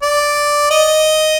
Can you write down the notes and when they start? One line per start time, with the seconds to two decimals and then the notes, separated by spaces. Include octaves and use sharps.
0.02 D5
0.71 D#5